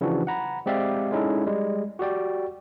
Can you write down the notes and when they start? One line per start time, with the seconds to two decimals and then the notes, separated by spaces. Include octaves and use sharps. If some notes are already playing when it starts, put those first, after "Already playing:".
0.01 C#3 E3 F3 D4 F#4
0.27 F#5 A#5 B5
0.66 G#3 C4 G4 D5 E5 F5
1.12 G#3 C#4 D#4 E4 A4
1.46 G3 G#3
1.99 F#4 G4 D5 G5